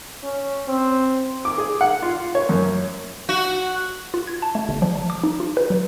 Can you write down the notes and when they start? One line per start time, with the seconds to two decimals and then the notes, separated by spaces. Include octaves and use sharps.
0.23 C#4
0.68 C4
1.45 D6
1.58 G#4
1.81 F#5
2.02 F4
2.35 C#5
2.49 F#2
3.29 F#4
4.14 F4
4.27 G#6
4.42 A5
4.55 A3
4.69 G1
4.82 F3
4.95 A5
5.10 D6
5.23 D#4
5.40 F4
5.57 B4
5.70 F#3